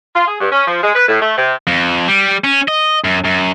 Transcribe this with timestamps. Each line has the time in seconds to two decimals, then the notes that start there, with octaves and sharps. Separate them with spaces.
0.15 F4
0.28 G#4
0.40 G2
0.52 C#4
0.66 F3
0.83 G#3
0.95 B4
1.08 A2
1.22 A3
1.37 C3
1.67 F2
2.08 G3
2.44 C#4
2.68 D#5
3.04 F#2
3.24 F#2